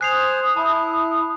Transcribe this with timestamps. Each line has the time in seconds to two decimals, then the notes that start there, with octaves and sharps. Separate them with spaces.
0.01 C5 G#5 D#6 F#6 C7 F7
0.56 E4 A5